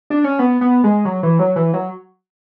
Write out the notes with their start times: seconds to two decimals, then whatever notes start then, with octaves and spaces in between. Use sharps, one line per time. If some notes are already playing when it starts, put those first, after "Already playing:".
0.10 D4
0.24 C#4
0.39 B3
0.61 B3
0.84 G#3
1.05 F#3
1.23 E3
1.39 F#3
1.56 E3
1.73 F#3